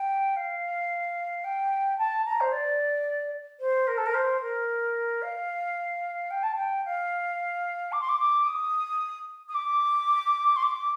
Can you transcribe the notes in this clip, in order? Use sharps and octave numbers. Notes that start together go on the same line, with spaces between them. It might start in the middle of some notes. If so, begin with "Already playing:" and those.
Already playing: G5
F5
G5
A5
A#5
C5
D5
C5
A#4
A4
A#4
C5
A#4
F5
G5
A5
G5
F5
D6
C6
D6
D6
D#6
D#6
D6
C6
D6